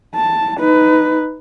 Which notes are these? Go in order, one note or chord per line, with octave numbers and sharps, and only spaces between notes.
A5
D#4 B4